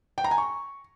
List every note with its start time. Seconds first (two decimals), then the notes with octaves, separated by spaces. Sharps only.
0.18 G5
0.24 A#5
0.31 G#5
0.38 C#6